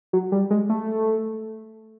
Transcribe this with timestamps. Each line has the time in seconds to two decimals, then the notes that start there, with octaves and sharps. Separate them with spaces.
0.13 F#3
0.32 G3
0.50 G#3
0.69 A3